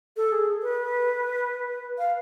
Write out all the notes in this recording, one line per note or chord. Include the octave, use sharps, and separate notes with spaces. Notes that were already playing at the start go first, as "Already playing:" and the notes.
A4
G#4
B4
F5